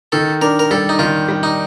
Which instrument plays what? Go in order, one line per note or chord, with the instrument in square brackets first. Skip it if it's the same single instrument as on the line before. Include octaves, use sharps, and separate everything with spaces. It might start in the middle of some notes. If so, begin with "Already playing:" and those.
[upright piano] D#3 [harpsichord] A4
[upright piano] D4 [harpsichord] A#4
[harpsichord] A#4
[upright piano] G3 [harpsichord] A4
[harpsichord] D#4
[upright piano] D#3 [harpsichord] F4
[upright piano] G3
[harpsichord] D#4